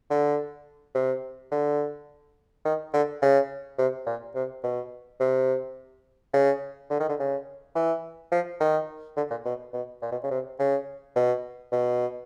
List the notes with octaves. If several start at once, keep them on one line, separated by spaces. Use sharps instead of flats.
D3
C3
D3
D#3
D3
C#3
C3
A#2
C3
B2
C3
C#3
D3
D#3
D3
C#3
E3
F3
D#3
D3
A#2
B2
B2
A#2
B2
C#3
C3
C#3
B2
B2